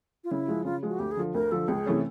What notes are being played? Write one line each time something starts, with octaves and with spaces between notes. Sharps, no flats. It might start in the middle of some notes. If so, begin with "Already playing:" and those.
F4
C#3 E4
F3 G#3
C#3 F4
F3 G#3
F#4
D2 G4
G#4
D3 F3
D2 A#4
D3 F3 A4
C#2 G#4
C3 E3 A3 C#4